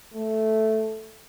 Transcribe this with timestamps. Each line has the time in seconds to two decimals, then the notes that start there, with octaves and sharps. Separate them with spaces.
0.14 A3